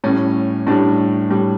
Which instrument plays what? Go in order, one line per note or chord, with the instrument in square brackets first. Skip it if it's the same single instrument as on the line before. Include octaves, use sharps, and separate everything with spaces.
[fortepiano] A2 G3 C#4
A2 G3 D4
A2 G3